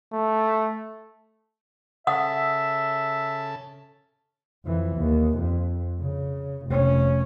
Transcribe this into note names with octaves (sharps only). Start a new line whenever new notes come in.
A3
C#3 A4 E5 F#5 A5 D#6
F2 E3
D#2
F2
C#3
F1 C#4